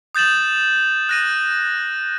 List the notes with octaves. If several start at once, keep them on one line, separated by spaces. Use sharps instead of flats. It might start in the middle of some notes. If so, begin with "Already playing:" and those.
D#6 G6 A6 E7 F#7
F#6 A#6 D#7